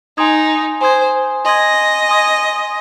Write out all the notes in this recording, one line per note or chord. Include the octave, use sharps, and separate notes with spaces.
D#4 G#5 C6 D#6 G#6
C5 G#5 C6 D#6 G#6
D#5 G#5 C6 D#6 G#6
G#5 C6 D#6 G#6